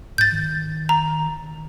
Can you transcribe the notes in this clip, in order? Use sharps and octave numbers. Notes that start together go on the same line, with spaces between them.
G#2 G6 A6
D#3
A#5